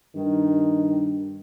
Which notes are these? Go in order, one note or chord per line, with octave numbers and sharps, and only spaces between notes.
G2 D#3